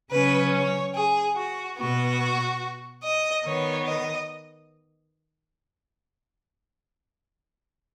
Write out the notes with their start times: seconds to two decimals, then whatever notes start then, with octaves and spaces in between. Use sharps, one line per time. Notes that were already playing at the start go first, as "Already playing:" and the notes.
0.11 C#3 F#3 C#4 B4
0.52 C#5
0.94 G#4
1.36 F#4
1.77 B2 B3 F#4
3.03 D#5
3.45 D#3 B3 C#5
3.86 D#5